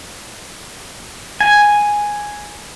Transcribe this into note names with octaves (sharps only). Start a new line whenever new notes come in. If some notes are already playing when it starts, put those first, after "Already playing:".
G#5